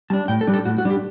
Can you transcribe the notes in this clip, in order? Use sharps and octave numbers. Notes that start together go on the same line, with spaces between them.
G3 D4 A5
A2 G5
A4
G3 D4
A4
A2 F#4
F#4
G3 D4
G4